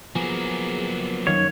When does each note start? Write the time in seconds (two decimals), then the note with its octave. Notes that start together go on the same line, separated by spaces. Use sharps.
0.15 F3 F#3 A#3 B3 G#4
1.27 F#2 D#3 C#5 F5